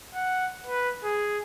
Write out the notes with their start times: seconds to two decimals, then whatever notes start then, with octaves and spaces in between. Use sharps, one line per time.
0.14 F#5
0.66 B4
1.04 G#4